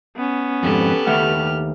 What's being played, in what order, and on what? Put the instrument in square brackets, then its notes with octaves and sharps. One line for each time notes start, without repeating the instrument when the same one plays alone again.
[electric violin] B3 C#4
[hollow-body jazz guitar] F2 G#2 [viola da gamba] G4 A4 B4
[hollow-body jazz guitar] D#2 A3 F#5 [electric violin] F6